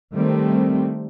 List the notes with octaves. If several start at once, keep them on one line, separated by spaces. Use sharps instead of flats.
D#3 G3 A3 C4